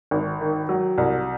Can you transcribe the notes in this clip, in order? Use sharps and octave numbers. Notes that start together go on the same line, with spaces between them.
G#1
D#3
F#3
C2